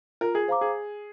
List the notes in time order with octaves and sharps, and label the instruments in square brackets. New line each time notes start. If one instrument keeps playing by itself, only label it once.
[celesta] F4 [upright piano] A#4
[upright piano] G#4
[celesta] C5 F5 A#5 D6
[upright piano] G#4